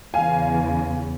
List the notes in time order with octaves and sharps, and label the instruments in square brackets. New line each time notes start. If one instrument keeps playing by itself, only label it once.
[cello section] E2 C#3 [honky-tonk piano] F5 G#5